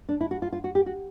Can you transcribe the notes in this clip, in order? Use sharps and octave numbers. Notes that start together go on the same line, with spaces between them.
D4
E4
F#4
F4
F4
F#4
G4
F#4